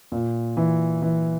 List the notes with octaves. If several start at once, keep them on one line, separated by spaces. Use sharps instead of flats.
A#2
E3
E3